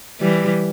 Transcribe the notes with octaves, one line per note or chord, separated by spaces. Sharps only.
E3 G3